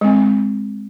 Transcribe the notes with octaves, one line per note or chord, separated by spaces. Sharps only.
G#3 C4